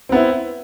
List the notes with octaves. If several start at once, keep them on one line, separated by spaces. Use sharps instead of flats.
B3 C4 E4